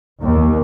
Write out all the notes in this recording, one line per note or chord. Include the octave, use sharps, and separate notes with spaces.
D#2